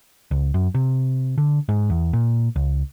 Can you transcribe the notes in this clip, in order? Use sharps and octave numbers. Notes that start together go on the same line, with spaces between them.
C#2
F#2
C3
D3
G#2
E2
A#2
C#2